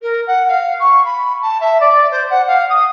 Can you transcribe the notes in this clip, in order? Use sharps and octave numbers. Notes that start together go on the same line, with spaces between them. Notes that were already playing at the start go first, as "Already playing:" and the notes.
A#4
F#5
F5
C#6
B5
A5
E5
D5
C5
F#5
F5
D#6